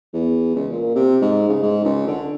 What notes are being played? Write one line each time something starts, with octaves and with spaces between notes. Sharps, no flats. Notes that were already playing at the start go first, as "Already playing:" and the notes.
E2
C#2
A#2
C3
G#2
C#3
G#2
C#2
D3